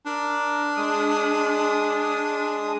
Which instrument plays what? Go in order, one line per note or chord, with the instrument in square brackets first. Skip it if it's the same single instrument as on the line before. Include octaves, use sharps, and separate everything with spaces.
[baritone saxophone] D4 [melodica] A#4
[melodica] G#3 D#6